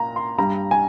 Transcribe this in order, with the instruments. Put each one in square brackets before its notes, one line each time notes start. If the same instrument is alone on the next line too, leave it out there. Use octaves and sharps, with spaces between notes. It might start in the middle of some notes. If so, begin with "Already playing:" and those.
Already playing: [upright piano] A#2 A#5
C6
G2 G3 A#5
G#5